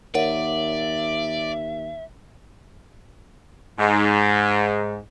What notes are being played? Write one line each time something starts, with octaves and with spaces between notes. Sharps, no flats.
D#2 A#4 C#5 D5 E5 F#5
G#2